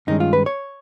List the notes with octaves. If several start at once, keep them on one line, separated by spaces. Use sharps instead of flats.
G2 D#3 G#3 C#4 D#4
F4
B4
C#5